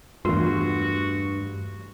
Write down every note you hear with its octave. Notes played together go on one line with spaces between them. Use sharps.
E2 G2 A3 F4 F#4 A#4 C6